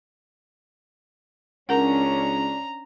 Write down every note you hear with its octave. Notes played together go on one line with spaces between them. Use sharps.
C#2 C#4 D4 A#4 F#5 A#5